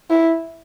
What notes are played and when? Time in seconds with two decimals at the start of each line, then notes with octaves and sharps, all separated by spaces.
0.10 E4